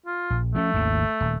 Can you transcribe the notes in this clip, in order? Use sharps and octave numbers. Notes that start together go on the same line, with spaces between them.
F4
A#1
F3 A3 C4 C#4
G#1 D#2 C#3
D#1